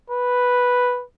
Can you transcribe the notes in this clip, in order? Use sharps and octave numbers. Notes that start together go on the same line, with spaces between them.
B4